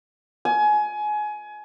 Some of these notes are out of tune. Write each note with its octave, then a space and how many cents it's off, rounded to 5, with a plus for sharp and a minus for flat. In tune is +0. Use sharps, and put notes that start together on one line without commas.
G#5 +25